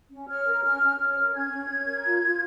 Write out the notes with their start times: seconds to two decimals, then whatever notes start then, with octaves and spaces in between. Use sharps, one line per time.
0.11 C#4
0.28 C#5 F6
0.46 A#4
0.63 C#4 F6
0.81 C#4
0.99 C#5 F6
1.16 A#4
1.34 C#4 G#6
1.52 C#4
1.69 C#5
1.87 A#4
2.05 F4
2.22 F4